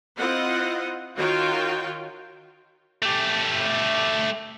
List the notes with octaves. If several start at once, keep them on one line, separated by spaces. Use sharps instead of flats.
C4 E4 F4 C5 D#5 F#5
D#3 F4 F#4 C#5 G5
A3 G4